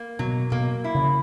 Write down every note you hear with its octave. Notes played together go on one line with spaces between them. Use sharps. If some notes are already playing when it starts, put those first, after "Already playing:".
Already playing: A#3
B2 F#3
B2 A#3
E4
C#3